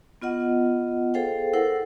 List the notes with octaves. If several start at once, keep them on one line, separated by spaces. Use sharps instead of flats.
B3 F4 D#5 F#5
G#4 A4 C5 F5 G5
E4 A4 A#4 C5 F#5